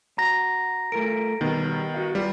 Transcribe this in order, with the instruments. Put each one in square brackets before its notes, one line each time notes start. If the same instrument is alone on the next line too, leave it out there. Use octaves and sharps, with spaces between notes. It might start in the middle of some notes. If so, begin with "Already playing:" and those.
[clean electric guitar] F#4 [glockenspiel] A#5 A#6
[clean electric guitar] A3 F4 A#4 [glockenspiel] D7
[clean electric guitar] B2 G3 [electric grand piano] D#3 B3
[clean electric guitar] F#4 F5
[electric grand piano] G3 [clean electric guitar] B3 F4